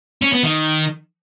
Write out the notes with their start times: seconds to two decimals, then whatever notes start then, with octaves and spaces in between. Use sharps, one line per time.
0.22 C#4
0.33 B3
0.43 D#3